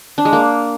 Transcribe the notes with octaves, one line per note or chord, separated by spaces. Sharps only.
D4
G#3
A#3